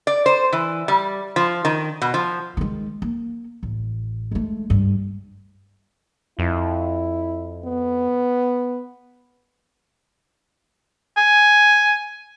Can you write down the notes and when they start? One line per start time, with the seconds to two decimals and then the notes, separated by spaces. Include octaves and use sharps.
0.07 D5
0.26 C5
0.53 E3
0.88 G3
1.36 F3
1.65 D#3
2.02 B2
2.14 F3
2.57 D#3 G#3
3.02 A#3
3.63 A1
4.31 G#3 A3
4.70 G2
6.39 F2 E4
7.65 B3
11.17 G#5